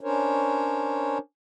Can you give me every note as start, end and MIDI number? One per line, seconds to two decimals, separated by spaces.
0.01 1.18 61
0.01 1.18 62
0.01 1.18 70
0.01 1.18 72
0.01 1.18 73